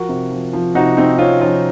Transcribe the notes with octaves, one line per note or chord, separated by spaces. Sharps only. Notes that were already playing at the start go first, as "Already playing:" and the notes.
Already playing: F3 F#4 A#4
C3
F3
F3
C3 D#4 F#4
C3 C4 D#4
C3 C#4 F4
F3 C#4 F4